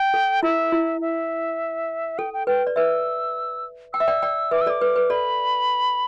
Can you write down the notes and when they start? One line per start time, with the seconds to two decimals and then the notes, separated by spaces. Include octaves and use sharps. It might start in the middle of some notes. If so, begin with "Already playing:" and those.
Already playing: G5
0.14 A4
0.43 E4 E5
0.72 E4
1.01 E5
2.18 A4 G5
2.33 G5
2.47 B4 G5
2.67 D5
2.76 B4 E5 E6
3.93 G5 E6
4.00 E5
4.08 D5 G5
4.22 D5 G5
4.51 B4 E5 D6
4.61 E6
4.67 A4 D5 D6
4.81 B4
4.96 B4
5.10 A4 D5 B5